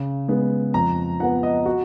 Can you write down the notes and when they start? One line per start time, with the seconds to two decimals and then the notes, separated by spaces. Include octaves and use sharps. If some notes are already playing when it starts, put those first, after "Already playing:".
Already playing: C#3
0.28 G#3 B3
0.74 F2 A#5
1.19 F3 B3 F#5
1.43 D#5
1.66 F#4